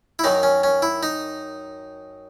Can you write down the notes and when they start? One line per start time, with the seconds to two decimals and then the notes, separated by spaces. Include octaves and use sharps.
0.19 E4
0.24 F#2 D#3 F#3 D#4
0.43 C#4
0.64 C#4
0.82 E4
1.03 D#4